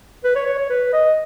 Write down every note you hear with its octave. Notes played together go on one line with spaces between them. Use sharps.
B4
C#5
C#5
C#5
B4
D#5